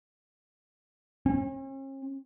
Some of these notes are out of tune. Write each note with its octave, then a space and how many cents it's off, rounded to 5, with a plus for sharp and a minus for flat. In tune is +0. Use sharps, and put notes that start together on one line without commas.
C#4 -45